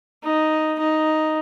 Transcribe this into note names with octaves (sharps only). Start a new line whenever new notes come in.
D#4
D#4